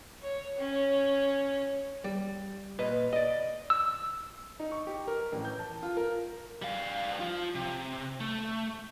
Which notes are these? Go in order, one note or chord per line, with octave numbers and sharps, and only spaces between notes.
C#5
C#4
G3
A#2 B4 D#5
D5 D#5
E6
D#4
C#6
G4
A#4
A1
G6
A5
F4
A#4
G3 F5
F3 F4
C3
A3